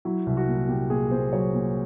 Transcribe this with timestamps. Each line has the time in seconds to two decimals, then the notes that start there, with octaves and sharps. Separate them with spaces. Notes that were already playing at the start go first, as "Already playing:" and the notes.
0.05 F#3 E4
0.26 C2
0.37 F#4
0.48 A#2
0.68 A#2 G4
0.90 A#2 G#4
1.11 A#2 C5
1.33 F#3 C#5
1.54 A#2